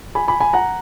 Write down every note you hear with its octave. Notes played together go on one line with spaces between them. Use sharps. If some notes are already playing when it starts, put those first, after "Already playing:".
G#5 B5
G#5 B5
G#5 B5
F#5 A#5